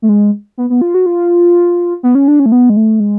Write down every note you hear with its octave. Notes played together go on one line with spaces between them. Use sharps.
A3
G#3
B3
B3
F4
F#4
F4
B3
C#4
D4
C#4
A3
B3
G#3
A3
G#3